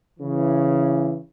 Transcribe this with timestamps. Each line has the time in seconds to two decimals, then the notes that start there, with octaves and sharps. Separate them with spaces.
0.18 C#3 E3